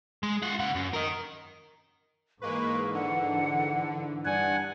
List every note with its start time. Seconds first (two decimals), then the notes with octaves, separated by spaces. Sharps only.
0.23 G#3
0.43 F4 F#5
0.59 C#3 F#5
0.75 F#2
0.93 A#4 D#5
2.42 G#2 E3 G#3 A#3 B4 C#6
2.94 D3 F#5
4.25 G2 D5 F#5 G#5